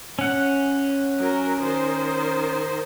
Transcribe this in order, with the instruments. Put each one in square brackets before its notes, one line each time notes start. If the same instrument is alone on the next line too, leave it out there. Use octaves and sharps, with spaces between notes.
[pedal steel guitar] C#4 F#5
[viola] F#3 A#4
D#3 C5